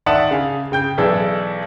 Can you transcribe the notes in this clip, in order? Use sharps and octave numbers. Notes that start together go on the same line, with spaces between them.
D#3 D5 E5 F#5 A5 D#6
C#3 F5 G#5
C#3 G5 G6
B1 E3 G#4 A4 D5 E6